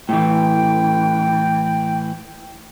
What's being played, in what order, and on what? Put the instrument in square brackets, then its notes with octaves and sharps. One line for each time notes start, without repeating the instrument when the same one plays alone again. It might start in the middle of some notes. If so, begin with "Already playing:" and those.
[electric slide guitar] A2 E3 [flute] G5